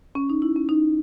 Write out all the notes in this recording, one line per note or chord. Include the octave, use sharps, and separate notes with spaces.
C#4
D#4
E4
C#4
D#4